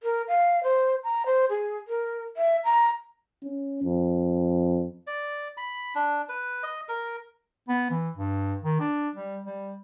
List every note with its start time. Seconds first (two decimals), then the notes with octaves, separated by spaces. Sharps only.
0.03 A#4
0.28 F5
0.64 C5
1.04 A#5
1.26 C5
1.49 G#4
1.88 A#4
2.37 E5
2.64 A#5
3.43 C#4
3.84 F2
5.07 D5
5.57 B5
5.95 D4
6.29 B4
6.63 D#5
6.89 A#4
7.68 B3
7.90 E3
8.16 G2
8.64 D#3
8.80 D4
9.15 G3
9.46 G3